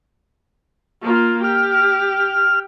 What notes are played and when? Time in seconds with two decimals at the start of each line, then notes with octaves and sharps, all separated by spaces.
1.02 A#3 F4
1.44 G4 F6